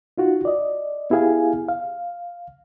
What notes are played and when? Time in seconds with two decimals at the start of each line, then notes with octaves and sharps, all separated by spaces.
0.18 D#4 F4 F#4
0.45 D5 D#5
1.10 B3 E4 G4 G#4 F5 G#5
1.68 F5